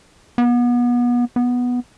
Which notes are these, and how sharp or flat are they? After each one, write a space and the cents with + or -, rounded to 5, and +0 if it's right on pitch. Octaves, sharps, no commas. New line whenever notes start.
B3 -30
B3 -5